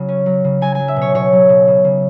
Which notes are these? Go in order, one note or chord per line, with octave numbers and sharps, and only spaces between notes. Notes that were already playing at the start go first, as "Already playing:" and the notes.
Already playing: C#3 F#3
C#4
F#3
C#3
F#3 G#5
F#3 G#5
E5
B2
C#5
B2 C#5
F#3
B2
C#3
C#3